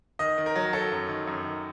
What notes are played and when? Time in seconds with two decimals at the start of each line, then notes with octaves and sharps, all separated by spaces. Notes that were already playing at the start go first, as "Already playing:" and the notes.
0.19 D#3 D#5
0.38 D#3
0.46 A#4
0.55 F#3
0.73 F#3 A4
0.92 F#2
1.09 D#3
1.27 F#2
1.44 D#3